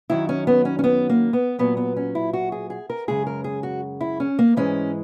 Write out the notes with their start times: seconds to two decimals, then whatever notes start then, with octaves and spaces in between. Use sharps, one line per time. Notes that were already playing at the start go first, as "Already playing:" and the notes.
0.10 F#2 D#3 F#3 E4
0.29 C#4
0.47 B3
0.65 C#4
0.79 C#4
0.84 B3
1.10 A#3
1.33 B3
1.59 A#2 F#3 B3
1.77 B3
1.97 C#4
2.15 E4
2.33 F#4
2.52 G#4
2.70 G#4
2.90 A#4
3.08 F#2 C#3 G#3 G#4
3.27 A#4
3.44 G#4
3.63 F#4
4.01 E4
4.20 C#4
4.39 A#3
4.57 G#2 E3 G#3 C#4